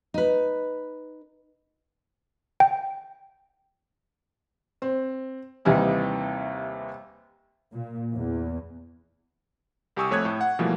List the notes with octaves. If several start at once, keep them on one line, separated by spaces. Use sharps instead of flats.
D#4 B4
G5
C4
D#2 C3 E3 G3 D#4
A#2
E2
C2 G4 G#5 C#6 D#6 E6
F2 A3 C#5 D#6 F#6 G#6
A2
F#5
B2 E3 F3 G3 A3 A#3